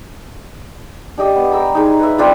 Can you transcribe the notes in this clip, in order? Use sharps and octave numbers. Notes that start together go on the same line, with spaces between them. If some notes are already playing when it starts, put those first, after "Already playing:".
D4 G4 D#5
B3
G5 A#5 E6
G#3 D#4
B4 E5
C4 D4 F4 A4